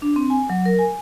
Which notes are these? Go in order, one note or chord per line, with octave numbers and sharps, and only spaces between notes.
D4
C4
G#5
F#3
A#4
G#5